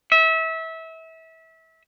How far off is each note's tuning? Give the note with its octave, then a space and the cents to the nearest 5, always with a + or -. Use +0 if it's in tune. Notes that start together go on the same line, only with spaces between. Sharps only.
E5 -25